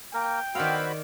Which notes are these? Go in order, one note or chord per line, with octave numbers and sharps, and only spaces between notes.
A#3 A#4 G5
D#3 B3 F#4 C5 D5 F5 B5 E6